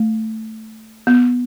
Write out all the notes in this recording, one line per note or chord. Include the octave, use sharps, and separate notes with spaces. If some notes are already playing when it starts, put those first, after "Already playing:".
Already playing: A3
B3